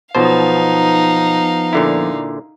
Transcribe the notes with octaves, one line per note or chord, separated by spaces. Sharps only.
B1 B2 F3 B3 D#4 C5 F5 A5
A#2 D3 E4